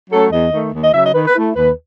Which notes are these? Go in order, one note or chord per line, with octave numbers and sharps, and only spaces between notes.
F#3 A3 C#4 A4
E2 D#5
D#3 A3
D#2
D#5
C#3 F#3 E5
D#5
D#3 B4
B4
A3 E4
D#2 B4